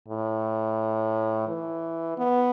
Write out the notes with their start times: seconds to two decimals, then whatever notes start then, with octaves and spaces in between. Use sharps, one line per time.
0.08 A2
1.48 E3
2.18 B3